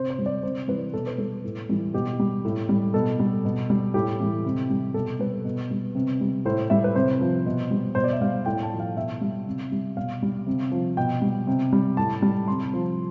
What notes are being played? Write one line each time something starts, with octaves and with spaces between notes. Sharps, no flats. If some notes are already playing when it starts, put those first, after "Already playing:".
Already playing: C3 C5
C5
G3
D5
C3 C5
E3 G3 B4
B2 A4
B4
G3 A4
A2
E3 G3
B2 G4
G3
A2
G3
B2 A4
G3
B2
G3
A2 G4
E3 G3
C3
G3
B2 A4
G3 B4
B2
G3
C3
G3
A2 C5
G3 E5
B4
C3 C5
F3
B2
G3
B2 C5
D5
E5
G3 F5
A2 G5
A5
F3
F5
B2 E5
G3
C3
G3
B2 F5
G3
C3
F3
B2 G5
G3
C3
G3
A2 A5
G3
C3 C6
F3